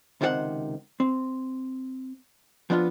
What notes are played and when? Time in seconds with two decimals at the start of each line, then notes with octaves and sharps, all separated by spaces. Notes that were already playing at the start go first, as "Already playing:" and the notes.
0.21 C#2 C3 D#3 F#4 C5 F#5
1.00 C4
2.70 F3 B3 D4 D#4 F4